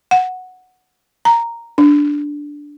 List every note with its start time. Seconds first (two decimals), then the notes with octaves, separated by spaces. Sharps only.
0.11 F#5
1.25 A#5
1.78 D4